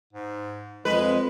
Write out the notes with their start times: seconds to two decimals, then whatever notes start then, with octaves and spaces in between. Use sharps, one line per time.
0.13 G#2
0.85 F2 G#3 B4